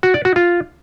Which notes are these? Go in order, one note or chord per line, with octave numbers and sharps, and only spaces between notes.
F#4
D5
F#4
F4